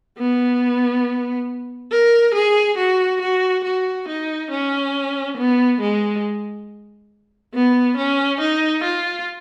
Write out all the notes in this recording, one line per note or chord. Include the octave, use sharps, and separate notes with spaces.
B3
A#4
G#4
F#4
F#4
F#4
D#4
C#4
B3
G#3
B3
C#4
D#4
F4